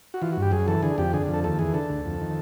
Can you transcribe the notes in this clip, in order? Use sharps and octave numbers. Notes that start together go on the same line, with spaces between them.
F#4
E3 F4
F#4
G2
G4
F#2 G#4
E3 A4
D3 G#4
F2 G4
D3 G#4
F2
A4
D#2 A4
E3 G#4
D3 A4
D2
F2
D#3